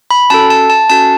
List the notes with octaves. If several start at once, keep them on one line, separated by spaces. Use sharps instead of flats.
B5
C#4 F#4 A4 A5
A5
A5
C#4 F#4 A4 A5